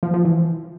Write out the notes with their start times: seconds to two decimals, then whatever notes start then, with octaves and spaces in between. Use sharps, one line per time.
0.03 F3
0.14 F3
0.25 E3